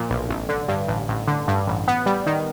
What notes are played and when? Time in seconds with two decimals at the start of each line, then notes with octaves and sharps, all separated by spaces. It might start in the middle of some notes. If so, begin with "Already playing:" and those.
Already playing: A#2 F3
0.10 B1
0.29 A1
0.49 D3
0.68 G2
0.88 A1
1.09 A1
1.27 D3
1.48 G2
1.67 A1
1.88 B3
2.06 G3
2.26 D#3